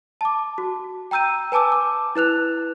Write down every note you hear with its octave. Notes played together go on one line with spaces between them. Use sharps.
A5 D6
F#4
G5 A#5 E6 G6 D#7
B4 G#5 A5 D6 E6
D6
E4 B4 F#6 F7